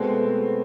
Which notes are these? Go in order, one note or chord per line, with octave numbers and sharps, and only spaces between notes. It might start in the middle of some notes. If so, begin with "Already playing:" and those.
Already playing: B2 G#3 A3 B3 C4